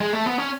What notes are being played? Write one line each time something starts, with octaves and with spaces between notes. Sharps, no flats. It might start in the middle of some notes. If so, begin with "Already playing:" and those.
G#3
A3
B3
C#4